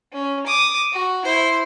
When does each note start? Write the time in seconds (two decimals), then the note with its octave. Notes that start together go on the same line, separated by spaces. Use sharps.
0.13 C#4
0.46 D6 D#6
0.93 F#4
1.24 E4 C5